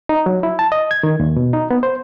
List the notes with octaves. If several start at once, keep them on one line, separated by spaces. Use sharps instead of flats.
D#4
F#3
E4
A5
D#5
G#6
D#3
D#2
B2
D#4
B3
C5